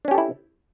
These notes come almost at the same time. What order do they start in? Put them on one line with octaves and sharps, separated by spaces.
D4 C#4 G4 A4 E4